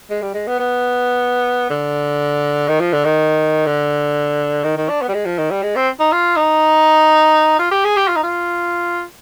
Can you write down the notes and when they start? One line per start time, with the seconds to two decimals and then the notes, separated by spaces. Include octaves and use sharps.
0.10 G#3
0.22 G3
0.34 G#3
0.47 B3
0.59 B3
1.70 D3
2.68 D#3
2.80 F3
2.93 D3
3.05 D#3
3.66 D3
4.64 D#3
4.77 D#3
4.89 D4
5.02 B3
5.09 G3
5.14 G#3
5.25 F3
5.38 D#3
5.51 G3
5.63 G#3
5.76 C4
6.00 D#4
6.12 F4
6.36 D#4
7.59 F4
7.71 G4
7.85 G#4
7.96 G4
8.08 F4
8.16 D#4
8.23 F4